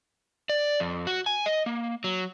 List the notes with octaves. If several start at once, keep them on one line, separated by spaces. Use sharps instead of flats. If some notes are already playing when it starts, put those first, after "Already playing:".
D5
F2
F#4
G#5
D#5
A#3
F#3